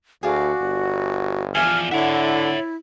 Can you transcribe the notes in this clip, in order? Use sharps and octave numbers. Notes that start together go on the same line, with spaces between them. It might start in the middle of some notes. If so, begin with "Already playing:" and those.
D2 F#4 G#4 D5 F5
G1
E2 F3 D5 E5 G#5 F6
D3 E4 C#5 E5 F#5